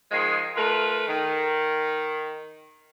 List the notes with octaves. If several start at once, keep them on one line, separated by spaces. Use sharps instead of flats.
D#3 F3 G#3
A3 F4 A#4 B4
D#3